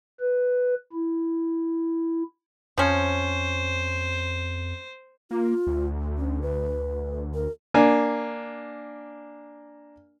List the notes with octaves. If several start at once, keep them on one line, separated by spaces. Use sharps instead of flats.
B4
E4
F2 F3 C#4 C5
A#3 F4
D2
C#4
D2 B4
A#4
A#3 D4 G#5